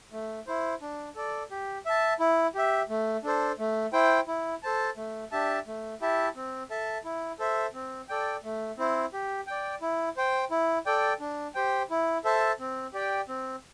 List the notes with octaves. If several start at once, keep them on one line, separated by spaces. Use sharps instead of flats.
A3
E4 C5
D4
A4 D5
G4
E5 A5
E4
G4 E5
A3
D4 A4 C5
A3
E4 C5 G5
E4
A4 C5 A5
A3
D4 G4 E5 A5
A3
E4 G4 E5 A5
C4
A4 E5 A5
E4
A4 C5 E5
C4
A4 D5 G5
A3
C4 E4 C5
G4
D5 G5
E4
C5 G5
E4
A4 D5 G5
D4
G4 C5 G5
E4
A4 C5 E5 A5
C4
G4 D5 G5
C4